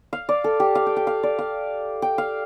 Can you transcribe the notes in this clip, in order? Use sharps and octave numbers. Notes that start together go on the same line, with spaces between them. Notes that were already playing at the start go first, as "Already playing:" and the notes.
F5
D5
A4
G4
F5
G5
G5
F5
D5
F5
G5
F5